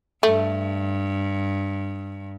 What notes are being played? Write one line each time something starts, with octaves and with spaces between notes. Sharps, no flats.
G2 A3